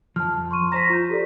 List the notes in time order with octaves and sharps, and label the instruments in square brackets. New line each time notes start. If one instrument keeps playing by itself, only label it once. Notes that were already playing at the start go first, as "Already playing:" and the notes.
[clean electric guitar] F2 F3 [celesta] A5 F6
[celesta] C6 C#6 D#7
[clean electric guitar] C5 A5 A#5 [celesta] A#6 B6
[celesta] F4 G6
G4 A4 D5